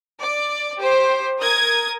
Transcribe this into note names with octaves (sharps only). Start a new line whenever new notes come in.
D5
G4 C5
A#4 D#6 G#6